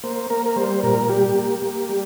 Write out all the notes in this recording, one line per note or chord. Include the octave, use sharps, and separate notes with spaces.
A#3 C5
A#3 A#4
A#4
G3 C5
A#2 A#4
G3 G4
A#3
A#3
G3